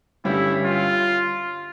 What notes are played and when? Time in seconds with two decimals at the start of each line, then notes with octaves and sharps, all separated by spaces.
0.24 G1 G2 G3 C#4 E4 G4
0.65 F4